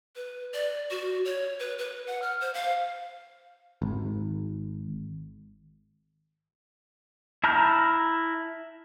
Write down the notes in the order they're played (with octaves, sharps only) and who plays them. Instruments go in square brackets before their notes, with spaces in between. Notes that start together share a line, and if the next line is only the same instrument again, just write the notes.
[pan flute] B4
D5
F#4
C#5
B4
B4
F#5
F6
C5
F5
[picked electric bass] G#1
[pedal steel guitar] E4 A5 A#5 F6 G6